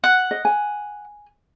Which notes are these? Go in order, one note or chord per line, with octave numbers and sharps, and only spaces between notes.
F#5
D#5
G#5